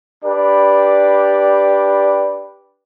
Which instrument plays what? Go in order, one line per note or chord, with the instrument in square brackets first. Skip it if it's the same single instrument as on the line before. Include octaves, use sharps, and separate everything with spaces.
[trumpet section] D4 G4 B4 D5